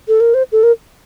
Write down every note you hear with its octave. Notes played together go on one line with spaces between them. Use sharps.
A4
A#4
C5
A4
A#4